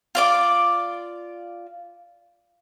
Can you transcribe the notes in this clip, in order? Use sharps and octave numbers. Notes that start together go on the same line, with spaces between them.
F4 D5 D6